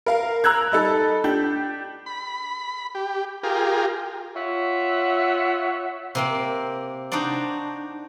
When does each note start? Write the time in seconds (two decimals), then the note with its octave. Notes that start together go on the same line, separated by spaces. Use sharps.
0.06 A#4 F5
0.44 A#5 E6 F#6 G#6
0.72 G3 D#4 A4
1.24 D4 G4 G6
2.06 B5
2.95 G4
3.43 F4 G4 G#4 A#4
4.35 F4 C#5 E5 F#5
6.15 C3 A#3 C4
7.12 D4 D#4 F#4 C5 D5